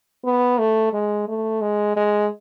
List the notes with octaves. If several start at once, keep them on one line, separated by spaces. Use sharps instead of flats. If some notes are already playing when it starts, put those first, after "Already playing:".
B3
A3
G#3
A3
G#3
G#3